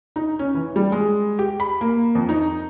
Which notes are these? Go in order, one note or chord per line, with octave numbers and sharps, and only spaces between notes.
D#4
C#4
E3
G3
G#3
G4
B5
A#3
F2
D#4